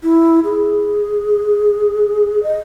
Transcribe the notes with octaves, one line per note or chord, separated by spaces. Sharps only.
E4
G#4
D#5